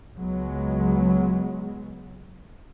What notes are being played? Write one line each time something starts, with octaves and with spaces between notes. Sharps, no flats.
C#2 F#3 G#3 B3